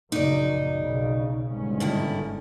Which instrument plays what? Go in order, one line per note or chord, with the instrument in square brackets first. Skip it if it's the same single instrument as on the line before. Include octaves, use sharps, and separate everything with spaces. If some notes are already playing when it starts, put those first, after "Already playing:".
[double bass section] A#1 F#2 C#3 [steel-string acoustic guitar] D#4 D5
[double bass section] B1 C#3
G1 G#2 C#4
[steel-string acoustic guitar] D3 D#3 E4